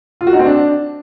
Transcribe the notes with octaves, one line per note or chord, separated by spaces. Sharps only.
F4
F#4
D#4
C4
D4